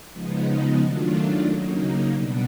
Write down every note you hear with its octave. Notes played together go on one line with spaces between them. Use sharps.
C#3 F3 G#3 B3 D#4
D#3 F#3 A3 D4 F4
C#3 F#3 A#3 D#4
B2 G3 B3 D4